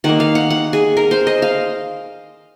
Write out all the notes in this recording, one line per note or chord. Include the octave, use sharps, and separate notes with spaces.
D#3 A#3 F#5
F5
F#5
F#5
G#4
A#4
C5
D#5
F5